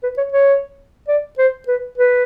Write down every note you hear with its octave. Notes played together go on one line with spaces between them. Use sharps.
B4
C#5
C#5
D5
C5
B4
B4